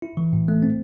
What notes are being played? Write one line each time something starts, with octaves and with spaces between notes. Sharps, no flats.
E4
E3
A2
A3
C4